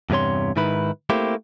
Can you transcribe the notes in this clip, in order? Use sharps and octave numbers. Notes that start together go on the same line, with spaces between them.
E2 G2 C3 C#5 C6
G#2 D#3 E4 B4
A3 A#3 C4 E4 G4